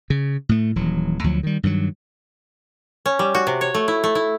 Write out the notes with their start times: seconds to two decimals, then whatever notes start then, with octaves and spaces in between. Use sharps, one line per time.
0.10 C#3
0.49 A2 A3
0.76 D#1 E3 F#3
1.24 D2 F3 F#3
1.43 D#3 G3
1.63 G2 D#3 F3 F#3
3.06 C#4
3.19 G3
3.35 F#4
3.47 C3
3.61 C#5
3.74 A3
3.88 E4
4.04 A3
4.15 E4